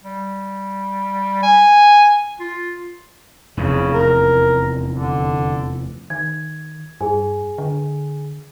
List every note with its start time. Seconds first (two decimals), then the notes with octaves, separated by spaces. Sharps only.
0.04 G3
1.43 G#5
2.40 F4
3.57 F1 E2 C#3
3.93 A#4
4.93 D3
6.10 D#3 G#6
7.01 G2 G#4 G#5
7.58 D3